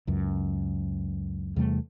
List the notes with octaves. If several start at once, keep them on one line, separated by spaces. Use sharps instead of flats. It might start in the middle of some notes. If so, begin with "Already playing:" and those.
C#2 F#2
E2 C3 G3 A3